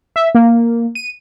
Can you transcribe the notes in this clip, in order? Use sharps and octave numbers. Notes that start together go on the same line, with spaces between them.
E5
A#3
D#7